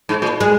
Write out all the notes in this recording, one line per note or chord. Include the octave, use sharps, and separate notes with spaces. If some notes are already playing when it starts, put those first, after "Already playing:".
G#2
A#2
G#3